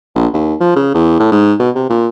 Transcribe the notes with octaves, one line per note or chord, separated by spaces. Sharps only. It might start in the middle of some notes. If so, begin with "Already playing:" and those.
A#1
D#2
F3
C#3
E2
A2
G#2
B2
C3
A#2